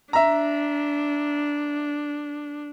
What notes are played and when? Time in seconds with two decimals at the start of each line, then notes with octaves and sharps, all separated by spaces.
0.13 D4 E5 A#5